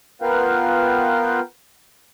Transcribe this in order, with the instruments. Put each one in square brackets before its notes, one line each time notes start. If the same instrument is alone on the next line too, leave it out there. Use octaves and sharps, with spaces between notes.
[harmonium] B3 F4 A#4 B4 F5 G5